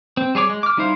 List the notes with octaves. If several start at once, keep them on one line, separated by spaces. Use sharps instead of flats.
C4
G3 G#4 C#5 D6
G#3
D6 F6
G3 D#4 E4 C5 F5